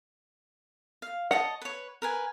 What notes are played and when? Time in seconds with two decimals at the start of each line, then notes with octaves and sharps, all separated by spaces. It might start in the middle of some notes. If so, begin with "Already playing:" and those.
1.02 F5
1.31 C#5 D#5 F#5 A5
1.62 B4 C#5
2.02 A#4 B4 G#5